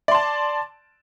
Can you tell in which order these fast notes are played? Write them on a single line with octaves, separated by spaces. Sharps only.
D5 C6 A5